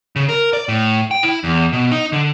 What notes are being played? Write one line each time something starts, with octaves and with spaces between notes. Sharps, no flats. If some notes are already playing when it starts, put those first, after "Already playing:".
C#3
A#4
D5
A2
G5
E4
E2
B2
D#4
D3